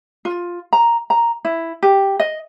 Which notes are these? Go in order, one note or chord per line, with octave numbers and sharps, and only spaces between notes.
F4
A#5
A#5
E4
G4
D#5